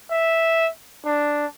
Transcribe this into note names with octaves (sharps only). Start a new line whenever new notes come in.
E5
D4